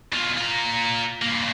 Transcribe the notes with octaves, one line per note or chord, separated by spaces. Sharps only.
B2 F4
F4 A#5
G2 A#3